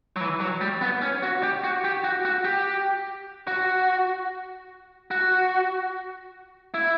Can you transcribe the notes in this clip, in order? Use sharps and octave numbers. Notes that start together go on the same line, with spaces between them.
F#3
E3
F#3
G3
B3
C#4
F#4
G4
F#4
G4
F#4
F#4
G4
F#4
F#4
E4